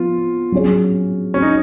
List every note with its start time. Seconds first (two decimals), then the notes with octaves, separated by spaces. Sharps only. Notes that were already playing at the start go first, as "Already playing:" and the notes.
Already playing: F3 B3 F4
0.52 F#3 C#4 G#4 C#5
1.34 C#4
1.42 D#4